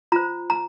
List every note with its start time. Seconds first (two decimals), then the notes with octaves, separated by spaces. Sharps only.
0.12 F4 C5 A#5
0.50 A#5